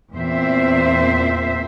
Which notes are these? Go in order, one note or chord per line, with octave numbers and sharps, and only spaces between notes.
E2 A#2 C4 C5 E5